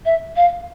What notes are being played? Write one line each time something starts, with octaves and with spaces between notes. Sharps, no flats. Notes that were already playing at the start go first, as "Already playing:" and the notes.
E5
F5